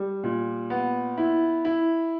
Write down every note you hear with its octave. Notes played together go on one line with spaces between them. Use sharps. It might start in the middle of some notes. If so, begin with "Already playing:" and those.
Already playing: G3
A#2
B3
E4
E4